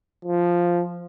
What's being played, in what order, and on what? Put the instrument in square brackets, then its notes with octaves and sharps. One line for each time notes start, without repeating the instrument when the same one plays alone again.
[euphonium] F3